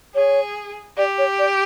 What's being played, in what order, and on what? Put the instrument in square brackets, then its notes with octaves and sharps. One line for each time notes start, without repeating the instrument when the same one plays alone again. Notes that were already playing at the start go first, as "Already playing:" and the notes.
[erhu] G#4 [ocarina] C#5
[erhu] G4 [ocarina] D5
[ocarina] C#5
D5